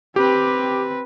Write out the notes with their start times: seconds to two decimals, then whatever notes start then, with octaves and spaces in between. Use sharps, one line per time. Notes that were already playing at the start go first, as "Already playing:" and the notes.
0.16 C4 G4 B4